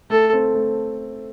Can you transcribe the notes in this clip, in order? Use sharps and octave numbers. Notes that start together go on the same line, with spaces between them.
A3 A4
C4
A3